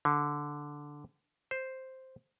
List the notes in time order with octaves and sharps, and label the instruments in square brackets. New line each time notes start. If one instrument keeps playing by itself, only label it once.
[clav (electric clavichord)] D3
C5